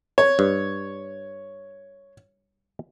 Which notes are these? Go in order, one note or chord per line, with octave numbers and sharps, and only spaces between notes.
C#5
G2